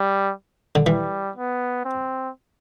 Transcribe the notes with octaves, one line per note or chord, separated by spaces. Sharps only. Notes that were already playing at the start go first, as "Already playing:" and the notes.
Already playing: G3
D3
E3 G3
B3
C4